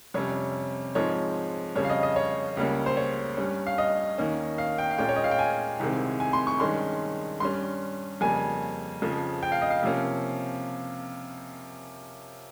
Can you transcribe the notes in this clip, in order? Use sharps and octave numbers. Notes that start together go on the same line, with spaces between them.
F2 C3 G3 C#4 C#5
G#2 F3 G#3 C4 C#5
F2 C#3 G3 C#5
F5
D#5
D#5
C#5
C#2 C#3 G3 A#3 C#4
C5
C#5
G2 G3 C#4
F5
D#5
D#2 D#3 A#3 C#4
F5
G5
F5
A#2 G#3 C#4 G5
C#5
D#5
F5
G5
G#5
C2 C3 D#3 G#3 C4
G#5
C6
C#6
G2 D#3 G#3 C#4 C6
G2 G3 C#4 C6
F2 C#3 G3 A#3 C#4 G#5
F2 C#3 F3
G5
F5
D#5
F5
C3 F3 A#3 C#4